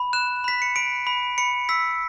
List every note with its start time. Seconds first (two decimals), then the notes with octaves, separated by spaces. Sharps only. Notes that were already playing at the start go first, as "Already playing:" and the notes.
Already playing: B5
0.13 F#6 E7
0.44 B5 B6
0.62 C#7
0.76 B5 D7
1.07 B5
1.38 B5 C#7
1.69 E6 B6